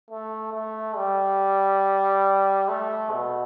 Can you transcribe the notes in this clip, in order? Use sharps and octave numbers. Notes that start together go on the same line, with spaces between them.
A3
A3
G3
A3
B2